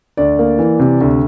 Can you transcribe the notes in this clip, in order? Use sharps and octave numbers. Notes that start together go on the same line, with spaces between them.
D2 D5
A#3
E3
C3
D2